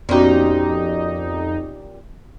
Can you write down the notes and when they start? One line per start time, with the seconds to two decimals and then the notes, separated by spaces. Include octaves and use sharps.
0.09 F2 A#2 B3 C#4 D#4 F#4 G4